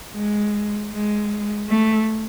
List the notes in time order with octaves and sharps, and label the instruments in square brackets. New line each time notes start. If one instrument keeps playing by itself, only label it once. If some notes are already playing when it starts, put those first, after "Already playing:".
[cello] G#3
G#3
A3